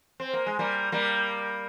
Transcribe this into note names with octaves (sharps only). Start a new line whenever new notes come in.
C4
A#3
G#3
G3 A#3
G3 A#3